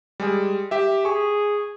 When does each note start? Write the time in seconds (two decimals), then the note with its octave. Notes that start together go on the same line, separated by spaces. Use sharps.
0.20 G3 G#3 G#4
0.71 G4 E5
1.05 G#4 C#6